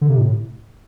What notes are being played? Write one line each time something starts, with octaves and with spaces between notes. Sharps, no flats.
D3
C3
A2